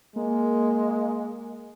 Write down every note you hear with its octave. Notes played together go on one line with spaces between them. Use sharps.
G#3 A#3